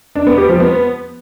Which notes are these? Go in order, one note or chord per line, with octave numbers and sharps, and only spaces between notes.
D4
B3
G4
F3
B3